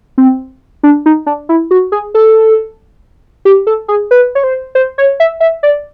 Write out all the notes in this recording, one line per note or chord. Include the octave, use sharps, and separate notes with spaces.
C4
D4
D#4
D4
E4
F#4
G#4
A4
G4
A4
G#4
B4
C#5
C5
C5
C#5
E5
E5
D5